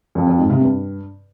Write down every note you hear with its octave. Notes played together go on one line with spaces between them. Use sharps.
F2
F2
G#2
C3
G2